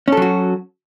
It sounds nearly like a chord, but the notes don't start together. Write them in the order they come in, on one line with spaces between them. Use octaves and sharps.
C#4 A4 F#3 F#4